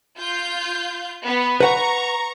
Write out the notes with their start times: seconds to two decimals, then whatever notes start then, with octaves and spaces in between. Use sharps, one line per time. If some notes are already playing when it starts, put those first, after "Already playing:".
0.19 F4 G6
1.26 B3
1.60 B4 F#5 A#5 C#6